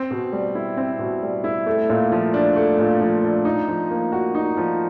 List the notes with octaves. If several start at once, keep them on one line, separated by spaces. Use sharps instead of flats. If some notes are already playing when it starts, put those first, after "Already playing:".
Already playing: C4
B2
G3
E4
C4
B2
G3
E4
A3
A#2
F3
D4
A3
A#2
F3
D4
D#4
F3
A#3
F#4
D#4
F3